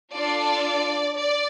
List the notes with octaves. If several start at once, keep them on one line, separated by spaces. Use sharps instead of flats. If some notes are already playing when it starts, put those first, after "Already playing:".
D4 F4 A4 D5
D5